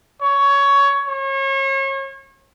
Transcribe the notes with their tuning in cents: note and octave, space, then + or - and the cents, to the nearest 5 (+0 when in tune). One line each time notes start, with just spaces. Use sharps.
C#5 +15
C#5 -35